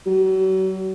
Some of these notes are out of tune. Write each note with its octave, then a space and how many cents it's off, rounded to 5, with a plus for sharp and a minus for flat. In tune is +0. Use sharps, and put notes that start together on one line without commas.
F#3 +40